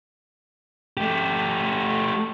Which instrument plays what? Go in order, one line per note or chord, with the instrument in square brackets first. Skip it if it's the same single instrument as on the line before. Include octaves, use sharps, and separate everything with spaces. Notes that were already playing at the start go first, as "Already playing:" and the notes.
[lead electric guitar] A3 G4